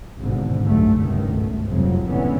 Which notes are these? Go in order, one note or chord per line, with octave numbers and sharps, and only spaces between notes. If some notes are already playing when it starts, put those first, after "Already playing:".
G#1 G#2 B2 D3
C2 F#2 D3 A3
G#1 C#2 G2 B2 D#3
A3
F1 C2 F2 F#3
G#1 A2 D3 E3 B3 C#4